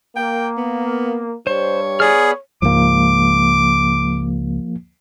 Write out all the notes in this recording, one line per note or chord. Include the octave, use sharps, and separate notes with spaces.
A#3 G5
B3
G2 G3 C5 C#5
B3 G#4 D5 F6
C#2 G#2 F3 A#3 D6